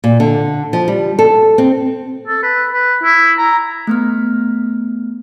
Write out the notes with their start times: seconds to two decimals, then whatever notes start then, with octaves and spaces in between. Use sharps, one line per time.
0.04 A#2
0.20 D3
0.73 F3
0.88 G3
1.19 A4
1.58 C4
2.28 A4
2.43 B4
2.73 B4
3.03 E4
3.38 A#5
3.87 A3 B3 F6